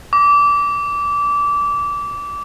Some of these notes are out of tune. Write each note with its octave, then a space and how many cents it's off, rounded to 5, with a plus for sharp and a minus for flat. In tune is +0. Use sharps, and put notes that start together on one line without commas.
D6 -25